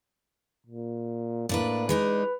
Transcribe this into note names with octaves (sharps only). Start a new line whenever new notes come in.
A#2
A2 A#3 D4 B4
G#3 D4 D#4 B4